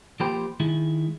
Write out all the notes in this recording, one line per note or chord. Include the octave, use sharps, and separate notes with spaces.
F3 A#3 G4 C5 G5 B5
D#3 G#3 E4